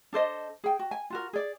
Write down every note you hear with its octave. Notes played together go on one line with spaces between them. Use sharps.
D4 A4 C5 D#5
G#4 G5
F#4
G#5
F4 F#4 A#4
G#4 D5